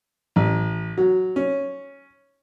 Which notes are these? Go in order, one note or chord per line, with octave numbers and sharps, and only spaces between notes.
A1
F#3
C#4